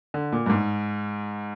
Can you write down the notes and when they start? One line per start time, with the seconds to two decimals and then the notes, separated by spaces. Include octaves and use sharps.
0.14 D3
0.32 A#2
0.46 G2
0.50 G#2